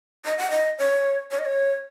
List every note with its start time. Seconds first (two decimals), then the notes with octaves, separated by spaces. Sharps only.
0.25 D#5
0.38 F#5
0.50 D#5
0.79 C#5
1.31 C#5
1.39 D#5
1.45 C#5